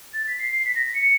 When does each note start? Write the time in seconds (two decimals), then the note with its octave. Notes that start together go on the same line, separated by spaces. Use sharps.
0.14 A6
0.27 B6
0.39 C7
0.53 C7
0.65 B6
0.75 A#6
0.85 B6
0.94 C#7